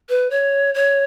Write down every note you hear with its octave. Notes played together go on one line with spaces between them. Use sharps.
B4
C#5
C#5